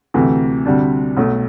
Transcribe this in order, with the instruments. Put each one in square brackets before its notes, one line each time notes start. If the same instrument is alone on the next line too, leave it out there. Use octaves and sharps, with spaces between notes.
[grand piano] D2 C3 E3 A3
D2 C3 G3 D4
B1 B2 A3